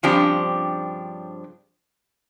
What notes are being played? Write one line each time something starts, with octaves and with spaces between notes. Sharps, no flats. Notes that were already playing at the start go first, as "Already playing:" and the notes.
G2 C#3 F3 C4 D4 G4